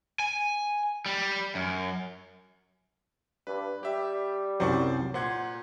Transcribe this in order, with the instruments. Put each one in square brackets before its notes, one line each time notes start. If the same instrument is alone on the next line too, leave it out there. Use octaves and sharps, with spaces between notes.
[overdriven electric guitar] G#5
G3
F#2
[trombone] G2 [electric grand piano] B4
[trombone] G3 [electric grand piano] G4 E5
[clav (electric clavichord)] C2 F#2 F#3 [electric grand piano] C5 D5 C#6
[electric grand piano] A#2 F#5 G#6 [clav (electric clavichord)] C5